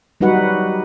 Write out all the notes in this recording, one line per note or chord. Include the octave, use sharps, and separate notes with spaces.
F#3 G3 D#4 F#4 B4 F#5